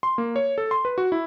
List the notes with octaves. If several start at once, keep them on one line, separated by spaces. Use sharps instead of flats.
C6
A#3
C#5
A4
C6
B4
F#4
E4